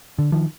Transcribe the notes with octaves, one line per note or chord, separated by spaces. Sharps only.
D3
D#3 F3